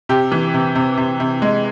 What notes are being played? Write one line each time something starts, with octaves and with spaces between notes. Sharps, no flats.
C3 G4
E3
C3
C3
C3
C3
G#3